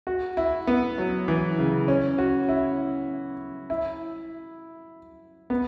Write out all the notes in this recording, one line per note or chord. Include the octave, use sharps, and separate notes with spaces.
F#4
E4
B3
F#3
E3
C#3
C#4
F#4
E4
E4
B3